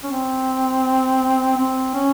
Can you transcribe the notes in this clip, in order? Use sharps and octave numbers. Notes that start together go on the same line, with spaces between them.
C#4
C4
C4
C#4